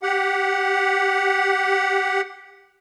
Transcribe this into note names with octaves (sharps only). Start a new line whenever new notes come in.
G4 F#5